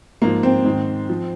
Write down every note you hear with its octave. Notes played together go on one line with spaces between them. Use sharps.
G#2 F3 A#3
C4
G#2 D#3
F3